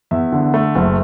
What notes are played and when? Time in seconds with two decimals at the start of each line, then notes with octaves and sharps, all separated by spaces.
0.11 E2 E5
0.32 D3
0.54 A3
0.76 F#1